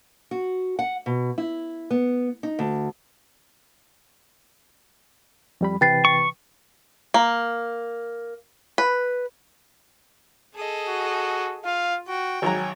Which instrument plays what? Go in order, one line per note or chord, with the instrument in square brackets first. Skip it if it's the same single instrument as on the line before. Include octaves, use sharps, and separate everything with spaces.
[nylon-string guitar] F#4
F#5
B2
E4
B3
D#4
D2
[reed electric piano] F2 G3 B5
[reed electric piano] C3 E3 B4 [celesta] G5 A6 C7
[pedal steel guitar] C#6
[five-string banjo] A#3
B4
[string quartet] G#4 A4 D#5
[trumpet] F#4
[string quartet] F4 [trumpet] F5
[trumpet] F#4 [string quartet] G5
[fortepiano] G#1 F#3 A#5 [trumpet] G#5